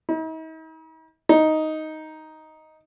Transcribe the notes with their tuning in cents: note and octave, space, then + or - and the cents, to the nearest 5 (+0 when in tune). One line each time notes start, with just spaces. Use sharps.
D#4 +45
D#4 +5